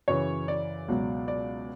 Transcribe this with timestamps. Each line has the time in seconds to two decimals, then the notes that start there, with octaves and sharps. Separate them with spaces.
0.08 F#2 C#3 E3 C#5
0.48 D5
0.88 C#2 B2 F#3
1.28 D5